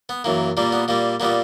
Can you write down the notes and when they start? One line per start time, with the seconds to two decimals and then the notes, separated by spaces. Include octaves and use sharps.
0.09 B3
0.24 F#2 E3 A#3
0.57 A#2 G3 A#3
0.72 B3
0.88 A#2 G3 A#3
1.20 A#2 G3 A#3 B3